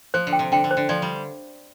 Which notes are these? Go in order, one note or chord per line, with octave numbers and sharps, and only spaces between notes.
F3 C5
D3
G5
C3
D3 G5
D3
C5
D3
F3 D5
G3